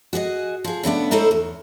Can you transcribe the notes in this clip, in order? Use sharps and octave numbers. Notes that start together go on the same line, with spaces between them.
F#4 G#4 D5 D#5
F3 G#4
C#3 A3 B3 D4
A3 D#4 E4 A4 C5 C#5
E2